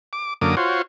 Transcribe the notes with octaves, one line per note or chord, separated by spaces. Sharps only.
D6
F#2 D3 A#3 D6 D#6
F4 F#4 C5 C#5